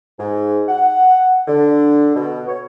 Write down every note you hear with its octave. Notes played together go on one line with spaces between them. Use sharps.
G#2
F#5
D3
B2
C#5